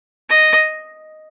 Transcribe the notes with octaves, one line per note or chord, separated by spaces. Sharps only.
D#5